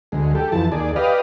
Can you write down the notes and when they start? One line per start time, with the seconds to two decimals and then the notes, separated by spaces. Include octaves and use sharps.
0.12 D2 G#3
0.35 G4 A4
0.52 F2 E3 A5
0.72 D#2 G#4 D5
0.96 G4 B4 D5 D#5 F5